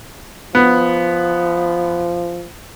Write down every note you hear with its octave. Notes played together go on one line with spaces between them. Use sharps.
F3 B3